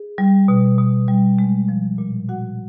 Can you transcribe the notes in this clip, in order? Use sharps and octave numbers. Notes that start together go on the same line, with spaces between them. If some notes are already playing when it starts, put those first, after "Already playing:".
Already playing: G#4
G3
B2
B2
G3
G#3
F3
A#2
A#2 F#4 F#5